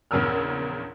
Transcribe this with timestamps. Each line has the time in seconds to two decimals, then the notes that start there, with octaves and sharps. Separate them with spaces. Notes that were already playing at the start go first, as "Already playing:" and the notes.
0.11 A#1 E2 C#3 A#4 E6 F6